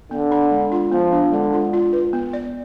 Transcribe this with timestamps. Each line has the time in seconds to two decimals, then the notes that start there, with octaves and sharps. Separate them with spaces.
0.11 D3 B3
0.32 D4
0.51 G#3
0.72 F4
0.91 F3 B3
1.12 D4
1.32 D3 G#3
1.53 F4
1.73 F4
1.93 B4
2.13 B3
2.33 D5